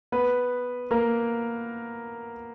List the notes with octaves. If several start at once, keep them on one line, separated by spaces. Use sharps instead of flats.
B3 B4
A#3 A#4